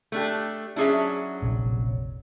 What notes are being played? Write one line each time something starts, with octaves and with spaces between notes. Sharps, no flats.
A3 D4 G4
F#3 C#4 D4 E4 G#4 E5
F1 A#1 C3